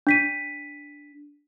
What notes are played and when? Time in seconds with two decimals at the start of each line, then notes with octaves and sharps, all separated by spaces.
0.07 D4 B6 D#7